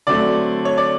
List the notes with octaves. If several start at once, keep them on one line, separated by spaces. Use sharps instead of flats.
D3 F#3 A3 C4 D5
C#5
D5